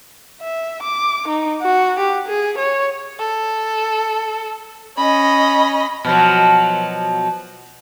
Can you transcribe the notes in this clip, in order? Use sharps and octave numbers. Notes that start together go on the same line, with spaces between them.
E5
D6
D#4
F#4
G4
G#4
C#5
A4
C#4 D#5 B5
B2 F3 F#3